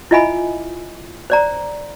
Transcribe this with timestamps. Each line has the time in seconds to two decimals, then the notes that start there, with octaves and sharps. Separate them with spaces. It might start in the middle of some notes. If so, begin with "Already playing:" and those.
0.11 E4 F4 D#5 E5 G#5 B5
1.30 C5 D5 A#5